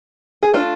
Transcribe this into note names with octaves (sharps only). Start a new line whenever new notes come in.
G#4
A3 D4 F4